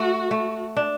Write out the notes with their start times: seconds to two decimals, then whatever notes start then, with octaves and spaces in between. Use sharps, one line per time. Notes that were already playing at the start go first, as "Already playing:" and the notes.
Already playing: A3 F#4
0.31 A3
0.77 D4